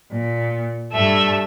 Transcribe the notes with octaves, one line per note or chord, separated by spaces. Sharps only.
A#2
G2 A3 E5